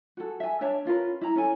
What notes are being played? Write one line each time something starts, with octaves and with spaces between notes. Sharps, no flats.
F#4 G#4 A4
E5 G#5
D4 C#5 E5 A5
C#4 F4 A#4 B4
E4 A#5
C#4 A4 G#5